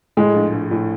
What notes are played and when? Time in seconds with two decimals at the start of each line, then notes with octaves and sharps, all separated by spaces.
0.17 A2 G#3
0.34 A#1
0.52 A#1
0.71 A2